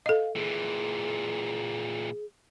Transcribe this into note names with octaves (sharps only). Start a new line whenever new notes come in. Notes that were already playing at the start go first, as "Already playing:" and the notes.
A4 D#5 F5
A#2 E3 G#4